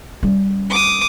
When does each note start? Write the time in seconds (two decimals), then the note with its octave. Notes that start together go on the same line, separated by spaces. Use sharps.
0.23 G3 C#4
0.70 D6 D#6